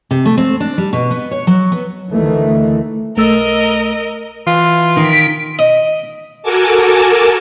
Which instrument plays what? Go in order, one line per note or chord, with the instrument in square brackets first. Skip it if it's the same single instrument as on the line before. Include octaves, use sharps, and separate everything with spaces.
[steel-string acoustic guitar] C3
A3
C4
D4
G3
B2
B3
C#5
F#3
B3
[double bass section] D2 D#3 E3 A3
[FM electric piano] B1 A3 E6 [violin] A#4 D#5
[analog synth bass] E3 [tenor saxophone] F4
[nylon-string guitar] D#3 [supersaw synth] B6 D7
[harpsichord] D#5
[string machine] F#4 A4 A#4 G#5 A5 D6